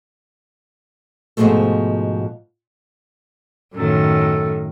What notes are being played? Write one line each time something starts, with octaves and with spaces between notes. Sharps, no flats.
G#2 B2 D#3 F3 G#3 A3
F#2 A2 D#3 A4